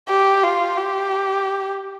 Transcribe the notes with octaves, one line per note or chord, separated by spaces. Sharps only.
G4
F4
G4